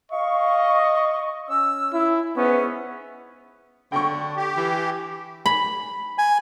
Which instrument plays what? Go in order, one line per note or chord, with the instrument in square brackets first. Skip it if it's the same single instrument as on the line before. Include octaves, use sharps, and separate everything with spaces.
[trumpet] D#5 [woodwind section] F5 C#6
[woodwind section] C#4 E6
[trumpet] E4
[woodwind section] G#2 C#4 E5 [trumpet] B3
[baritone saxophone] D3 [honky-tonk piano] G5 C#6
[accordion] G4
[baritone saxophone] E3
[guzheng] B5
[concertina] G#5